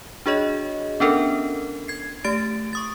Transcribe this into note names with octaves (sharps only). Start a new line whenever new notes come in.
D4 F#4 G#4 C#5 D#5
B3 C#4 D4 A4 A#4
G#6 C7
A3 G4 A6 D7
C#6 D#6 A6